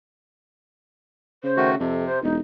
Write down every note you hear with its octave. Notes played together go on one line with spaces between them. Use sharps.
C#3 C5
D#3 A3 F#4
F2 C3 A4
C5
E1 D#4